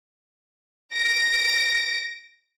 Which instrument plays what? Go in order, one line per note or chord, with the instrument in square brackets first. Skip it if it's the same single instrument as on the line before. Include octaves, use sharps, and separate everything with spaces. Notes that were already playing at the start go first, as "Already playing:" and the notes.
[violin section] A#6 D7